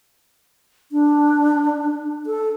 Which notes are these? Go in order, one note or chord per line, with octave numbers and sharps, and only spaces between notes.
D4
A4